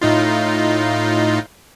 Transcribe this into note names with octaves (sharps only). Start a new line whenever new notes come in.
A2 D#4 F4